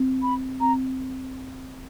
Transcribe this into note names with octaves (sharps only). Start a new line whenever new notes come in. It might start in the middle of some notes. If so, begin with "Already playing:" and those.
Already playing: C4
B5
C4 A#5